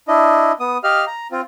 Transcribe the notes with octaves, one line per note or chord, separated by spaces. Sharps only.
D4 E4 D#5
B3 D#6
G4 D#5 F5 F6
A#5
C4 F4